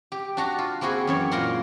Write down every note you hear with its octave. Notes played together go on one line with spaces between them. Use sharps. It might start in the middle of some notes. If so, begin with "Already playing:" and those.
G4
D4 F#4 A#5
F4
A#3 C4 E4 F#4 G#4
F#2 E3 C#5
A#2 A#3 A#4 A#5 C6